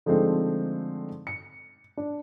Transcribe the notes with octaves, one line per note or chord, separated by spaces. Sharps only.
D3 F3 G#3 A3 C4 D#4
C#7
D4